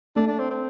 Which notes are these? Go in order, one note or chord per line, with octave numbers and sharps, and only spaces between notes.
A3 D4
D4
C4
C4